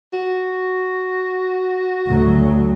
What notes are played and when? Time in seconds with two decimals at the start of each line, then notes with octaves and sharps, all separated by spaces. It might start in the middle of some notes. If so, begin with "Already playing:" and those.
0.13 F#4
2.08 D2 F#3